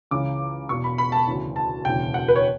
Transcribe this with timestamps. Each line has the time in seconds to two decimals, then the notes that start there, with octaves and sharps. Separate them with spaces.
0.11 C#2 C#3 E3 D6
0.69 E1 E2 B2 C#6
0.84 B5
0.98 B5
1.12 A5
1.27 D2 C#3 E3
1.56 A5
1.85 E1 D2 C#3 E3 G5
2.14 F#5
2.28 B4
2.36 C#5